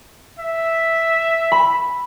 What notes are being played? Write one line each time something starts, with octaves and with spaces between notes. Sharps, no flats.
E5
B5